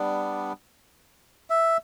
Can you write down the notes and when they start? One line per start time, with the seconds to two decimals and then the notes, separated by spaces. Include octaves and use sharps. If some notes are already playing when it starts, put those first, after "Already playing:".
Already playing: G3 B3 D4
1.50 E5